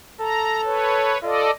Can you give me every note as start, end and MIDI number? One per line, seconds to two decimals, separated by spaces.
0.21 1.16 69
0.21 0.61 82
0.65 1.18 71
0.65 1.18 73
1.23 1.47 65
1.23 1.51 69
1.23 1.51 74
1.23 1.51 75